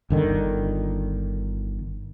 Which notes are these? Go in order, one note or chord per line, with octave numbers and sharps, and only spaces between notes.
G1 D3 D#3